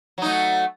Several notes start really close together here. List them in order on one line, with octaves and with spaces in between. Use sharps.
F#3 D#4 A3